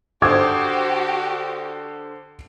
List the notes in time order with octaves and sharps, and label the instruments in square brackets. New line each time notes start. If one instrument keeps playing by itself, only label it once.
[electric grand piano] D3 C5 [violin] F#4 G4 [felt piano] D6 D#6 G#6